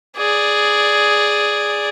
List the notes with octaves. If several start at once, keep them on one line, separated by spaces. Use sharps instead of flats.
G#4 D5